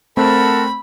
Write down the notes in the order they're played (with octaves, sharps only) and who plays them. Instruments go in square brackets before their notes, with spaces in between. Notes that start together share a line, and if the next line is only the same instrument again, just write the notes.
[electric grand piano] A3 C4 [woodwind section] A#4 F#5 A5 [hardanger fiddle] B5